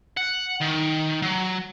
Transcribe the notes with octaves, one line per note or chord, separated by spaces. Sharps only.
F#5
D#3
F#3